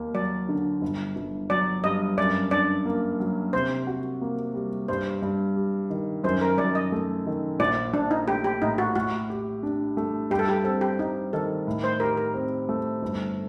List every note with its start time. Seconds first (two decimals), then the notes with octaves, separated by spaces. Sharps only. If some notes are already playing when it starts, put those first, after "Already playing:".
Already playing: D#2 A#3
0.14 F#3 D5
0.49 D3
0.81 G1
1.16 G1
1.50 F#3 D5
1.84 G2 D#5
2.17 F#2 D5
2.51 D4 D5
2.86 A#3
3.20 F#3
3.53 C3 C5
3.87 F#4
4.21 A#3
4.54 G3
4.88 G2 C5
5.22 G2
5.56 G3
5.90 D#3
6.24 F#2 C5
6.41 A#4
6.58 F#2 D5
6.75 D#5
6.92 A3
7.27 D#3
7.59 A#1 D5
7.93 A#1 D4
8.11 D#4
8.28 A3 G4
8.44 G4
8.61 A2 D#4
8.78 F#4
8.96 A2 F#4
9.30 G4
9.63 D4
9.97 A3
10.30 G2 G4
10.39 A4
10.48 G4
10.64 C4 A4
10.81 G4
10.98 G3 D#4
11.33 D#3 A4
11.67 A2
11.84 C5
12.00 G4 A#4
12.17 A#4
12.34 C4
12.69 A3
13.02 G1